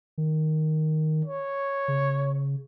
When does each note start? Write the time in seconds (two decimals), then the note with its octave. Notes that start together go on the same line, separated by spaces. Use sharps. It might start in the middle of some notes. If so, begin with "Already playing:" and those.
0.18 D#3
1.25 C#5
1.88 C#3